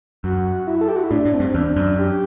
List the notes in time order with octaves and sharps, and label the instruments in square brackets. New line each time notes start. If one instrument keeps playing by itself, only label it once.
[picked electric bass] F#2 [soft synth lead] F#4
[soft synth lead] E4
A4
G4
F#4
E4
[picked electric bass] A2 [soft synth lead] D4
[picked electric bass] A2
[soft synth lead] C4
[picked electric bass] G2
[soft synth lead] C4
[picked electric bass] E2 [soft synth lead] D4
[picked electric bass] F#2
[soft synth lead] G4